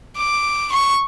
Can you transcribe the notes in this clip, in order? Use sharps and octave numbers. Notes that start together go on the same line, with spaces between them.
D6
C#6